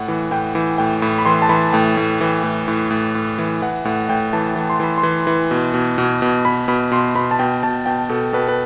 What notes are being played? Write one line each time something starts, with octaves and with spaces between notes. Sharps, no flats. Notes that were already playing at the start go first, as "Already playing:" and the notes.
Already playing: A2 F#5
E3
A2 G5
E3
A2 G5
A2 B5
B5
E3 C6
A5
E3 B5
A2 G5
A2
E3
A2
A2
A2
A2
E3
E3 F#5
A2 F#5
A2 G5
E3 A5
E3
C6
E3 B5
C6
E3
E3
B2
B2
B2
B2
B2 B5
B2 B5
B2 C6
B2 B5
A5
B2 G5
B2 A5
B2 G5
B2 A4
B2 B4
B4